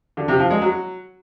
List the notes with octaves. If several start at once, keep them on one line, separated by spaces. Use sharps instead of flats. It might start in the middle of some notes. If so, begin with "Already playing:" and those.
D3
C3
F3
G#3
F#3